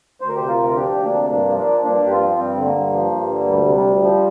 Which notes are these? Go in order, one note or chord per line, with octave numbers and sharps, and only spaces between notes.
D2 C5
A#4
C3 G4 C5
F4 A#4
D2
F4
F3 D4 G4
D2
A#3 D4
C3
G2 A#3 D4
F3
A#3 D4
F3
G2 A#3 D4
G2 G4
C4 F4
F3
G2 G3 C4
D3 G3
A#3
G2
F3
G2
D3
D2 G3
C3
G3
D2
F3